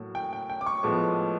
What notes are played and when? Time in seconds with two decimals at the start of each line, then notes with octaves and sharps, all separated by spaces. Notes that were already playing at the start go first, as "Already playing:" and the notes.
Already playing: A2 F#3 A#3
0.15 G5
0.33 G5
0.50 G5
0.61 D6
0.66 C#6
0.83 A2 F3 G#3 B3